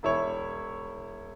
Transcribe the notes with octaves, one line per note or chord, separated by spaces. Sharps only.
E1 E4 C#5